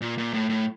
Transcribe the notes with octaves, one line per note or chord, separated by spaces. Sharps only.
A#2
A#2
A2
A2